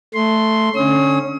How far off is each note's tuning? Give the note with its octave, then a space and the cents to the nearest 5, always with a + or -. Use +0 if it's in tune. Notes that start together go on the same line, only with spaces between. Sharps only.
A3 +0 C6 +0
D3 +0 C#4 -15 D#6 +40